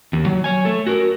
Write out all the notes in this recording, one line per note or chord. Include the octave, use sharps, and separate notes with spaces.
D#2
F#3
C#5 G#5
A3 A4
F#4 A#4